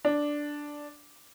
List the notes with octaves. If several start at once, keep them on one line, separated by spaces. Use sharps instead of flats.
D4